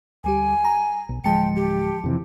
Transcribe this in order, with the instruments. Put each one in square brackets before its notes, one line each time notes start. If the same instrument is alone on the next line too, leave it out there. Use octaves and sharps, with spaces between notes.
[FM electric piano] D2 G3 G4 [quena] G#5
[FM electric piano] A#5
[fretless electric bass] B1
[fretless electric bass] D1 G#3 [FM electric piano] F3 A5 C#7 [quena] G5
[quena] G4
[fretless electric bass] F2 C3 E3